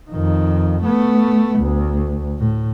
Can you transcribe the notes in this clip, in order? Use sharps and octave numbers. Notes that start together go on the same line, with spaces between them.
F2 D#3
A3 B3
D2
A2